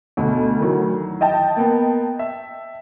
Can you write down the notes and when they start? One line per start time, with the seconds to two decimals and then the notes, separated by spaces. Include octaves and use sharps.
0.17 D2 B2
0.59 D#3 E3 F#3
1.21 D#5 G5 A5
1.57 A#3 B3
2.19 E5